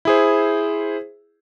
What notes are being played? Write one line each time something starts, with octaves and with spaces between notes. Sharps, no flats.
E4 G#4 C5